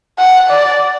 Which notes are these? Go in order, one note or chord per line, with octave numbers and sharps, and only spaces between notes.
F#5
D5